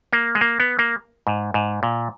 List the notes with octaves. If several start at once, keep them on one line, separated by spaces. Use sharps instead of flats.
A#3
G#3
A#3
B3
A#3
G#2
G#2
A#2